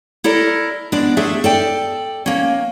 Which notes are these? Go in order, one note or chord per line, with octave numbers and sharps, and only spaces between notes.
E4 A4 A#4 D5
G#3 B3 D4 D5
A3 D4 G#4 E5
A4 D5 G5
A#3 C#4